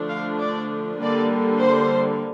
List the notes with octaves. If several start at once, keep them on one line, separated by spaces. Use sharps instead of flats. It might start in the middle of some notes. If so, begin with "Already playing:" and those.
Already playing: D3 F3 A3 D4
F5
D5
D3 G3 A#3 D5
C5